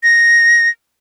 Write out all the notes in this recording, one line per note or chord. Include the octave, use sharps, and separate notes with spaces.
A#6